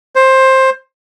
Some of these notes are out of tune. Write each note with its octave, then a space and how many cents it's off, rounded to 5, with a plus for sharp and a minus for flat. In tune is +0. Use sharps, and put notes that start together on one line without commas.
C5 +15